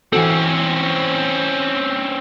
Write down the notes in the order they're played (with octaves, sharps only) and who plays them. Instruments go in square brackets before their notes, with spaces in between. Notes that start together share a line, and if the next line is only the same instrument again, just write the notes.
[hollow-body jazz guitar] E3 F#4 A4 [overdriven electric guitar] C4 C#4